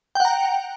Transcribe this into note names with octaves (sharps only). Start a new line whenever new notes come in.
F#5 G5 A#5